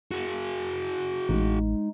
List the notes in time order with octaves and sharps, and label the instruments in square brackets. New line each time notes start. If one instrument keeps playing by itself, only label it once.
[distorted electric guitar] F#4 G#4
[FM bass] A1 [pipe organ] G#3 D#4